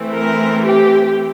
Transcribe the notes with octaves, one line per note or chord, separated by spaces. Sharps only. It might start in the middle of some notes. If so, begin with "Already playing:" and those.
Already playing: E3 A3 C4
A#4
G4